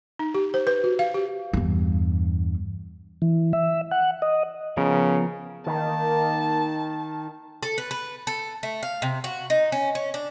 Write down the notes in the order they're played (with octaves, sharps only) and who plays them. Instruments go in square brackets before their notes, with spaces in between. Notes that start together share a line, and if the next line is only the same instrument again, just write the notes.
[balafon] D#4
G4
C5
B4
F#4
F5
G4
[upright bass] E2 G2
[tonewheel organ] E3
E5
F#5
D#5
[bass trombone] C#3 [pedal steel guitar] F3 B3 A#4
[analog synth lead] D#3 [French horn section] A#3 [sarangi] A5
[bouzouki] A4
B4
B4
A4
A3
F5
C3
F#4
D#4
C#4
C#4
D4